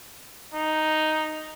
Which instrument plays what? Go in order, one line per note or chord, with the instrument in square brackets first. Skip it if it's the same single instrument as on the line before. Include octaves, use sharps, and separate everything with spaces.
[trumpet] D#4